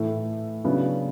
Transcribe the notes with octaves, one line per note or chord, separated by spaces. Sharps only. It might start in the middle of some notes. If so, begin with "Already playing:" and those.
Already playing: A2 E3 A3 E4
C#3 F#3 B3 D4